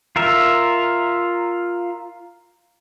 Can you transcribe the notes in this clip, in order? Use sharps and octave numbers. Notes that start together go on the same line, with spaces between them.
F4 A#4 E5